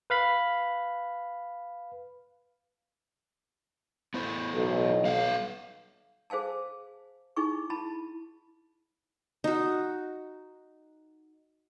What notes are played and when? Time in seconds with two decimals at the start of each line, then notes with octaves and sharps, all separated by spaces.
0.10 B4 F5 B5
4.14 B3 E4 C5
4.54 B1
5.05 G3 F5 F#5
6.30 G#4 C5 F5 G#5 A5
7.36 D#4 E4 G#4 G#5 C#6
7.70 E4 A5 B5
9.44 D#4 F#4